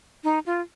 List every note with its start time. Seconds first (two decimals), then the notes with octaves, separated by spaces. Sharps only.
0.24 D#4
0.46 F4